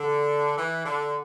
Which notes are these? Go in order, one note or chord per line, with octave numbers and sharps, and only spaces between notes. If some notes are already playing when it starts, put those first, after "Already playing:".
Already playing: D3
E3
D3